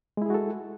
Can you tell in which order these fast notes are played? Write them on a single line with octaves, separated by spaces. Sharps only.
G#3 E4 G#4 F#4 A4